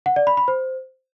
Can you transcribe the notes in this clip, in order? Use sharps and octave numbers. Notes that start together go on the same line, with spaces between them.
F#5
D5
B5
B5
C5